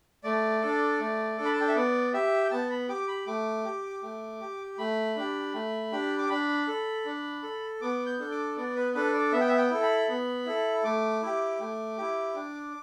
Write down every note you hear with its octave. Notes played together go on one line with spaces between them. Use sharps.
A3 D5
D4 A4
A3
D4 A4
B5
A5
G5
E5
B3 D5
G4 E5
G5
B3 A5
B5
G4 D6
B5
A3 D6
G4
A3
G4
A3 B5
D4 G4
A3
D4 G4
D6
D4 B5
A4
D4
A4
B3 D6
G6
D4 A4
D6
B3 D5
B4
D4 A4 B4
D5
B3 E5
G5
E5
G5
E4 A4
B5
B3
E4 A4
A3 D6
E4 G4
A3
E4 G4
D4